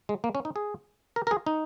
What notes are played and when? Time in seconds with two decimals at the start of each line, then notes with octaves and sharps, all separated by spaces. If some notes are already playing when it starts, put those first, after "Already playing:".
0.09 G#3
0.24 A#3
0.35 C#4
0.45 D#4
0.56 G#4
1.16 A#4
1.27 A#4
1.31 G#4
1.46 D#4